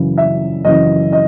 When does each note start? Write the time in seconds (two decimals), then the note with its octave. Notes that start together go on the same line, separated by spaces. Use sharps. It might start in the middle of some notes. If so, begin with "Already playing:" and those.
Already playing: F#2 C#3 E3
0.18 E5
0.65 F#2 C#3 E3 D#5
1.12 D#5